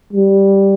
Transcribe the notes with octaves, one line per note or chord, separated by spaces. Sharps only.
G3